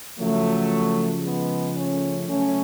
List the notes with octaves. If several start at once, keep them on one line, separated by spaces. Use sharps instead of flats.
C#3 F3 F#3 A3
G#3 B3
A3 C#4
C#3 F#3 A3 C#4